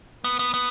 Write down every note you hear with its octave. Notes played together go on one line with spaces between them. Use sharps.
B3
B3
B3